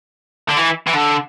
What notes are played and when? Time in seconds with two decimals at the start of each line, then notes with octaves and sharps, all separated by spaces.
0.49 D3
0.57 E3
0.87 E3
0.94 D3